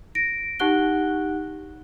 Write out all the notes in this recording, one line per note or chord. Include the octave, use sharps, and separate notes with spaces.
A#6 D7
D#4 G4 F#5 F#6 G7